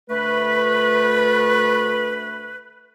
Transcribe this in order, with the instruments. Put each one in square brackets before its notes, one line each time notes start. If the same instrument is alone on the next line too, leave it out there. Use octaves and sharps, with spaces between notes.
[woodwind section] D2 A3 B4